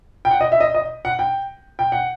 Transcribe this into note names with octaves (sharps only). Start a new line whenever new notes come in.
G5
F#5
D#5
E5
D#5
D#5
F#5
G5
G5
F#5